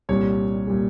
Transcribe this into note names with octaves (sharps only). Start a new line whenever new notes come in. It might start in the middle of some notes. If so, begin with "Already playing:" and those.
C2 A#2 G3 C#5
A#2 G3